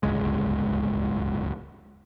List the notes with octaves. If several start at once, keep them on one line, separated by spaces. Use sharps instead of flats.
D1 G1 C#2 G#3